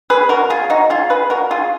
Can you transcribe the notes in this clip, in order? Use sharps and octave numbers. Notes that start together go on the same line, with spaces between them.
G#4 B4
F#4 A#4
F4 G#4
D#4 F#4
F4 G#4
G#4 B4
F#4 A#4
F4 G#4